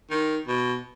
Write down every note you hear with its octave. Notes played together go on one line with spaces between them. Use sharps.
D#3
B2